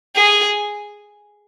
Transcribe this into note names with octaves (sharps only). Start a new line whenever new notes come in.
G#4